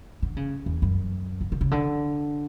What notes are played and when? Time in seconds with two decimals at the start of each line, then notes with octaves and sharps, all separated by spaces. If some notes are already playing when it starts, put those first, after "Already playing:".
0.22 D3
0.37 C#3
0.66 E2
0.82 F#2
1.41 D3
1.52 D3
1.61 C#3
1.71 D3